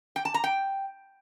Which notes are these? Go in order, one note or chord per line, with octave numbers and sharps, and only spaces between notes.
G5
A5
A#5
G5